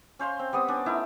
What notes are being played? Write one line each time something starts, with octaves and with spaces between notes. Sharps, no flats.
C#4 C5 F5 C6
C4
G3 B3 C4 D#6
C#4 D4
A3 D#4 E4 A#4